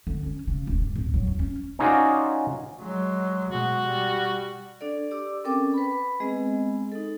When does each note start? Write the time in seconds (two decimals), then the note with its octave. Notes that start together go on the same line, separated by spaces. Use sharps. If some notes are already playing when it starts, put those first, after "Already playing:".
0.07 D3
0.23 C#4
0.47 C#3
0.67 D#1
0.80 G2
0.96 D1
1.14 F#3
1.27 E2
1.39 C#4
1.79 C#4 D#4 F4 F#4 G#4 D5
2.80 F#3 G#3
3.51 B2 G#3 F#4
3.85 G3
4.81 D4 A4 D5
5.11 G4 D5 D6 E6
5.44 C4 C#4 A4 A#4 G5 D6
5.74 B4 B5
6.20 G#3 B3 C4 G#4 D#5
6.92 D#4 A4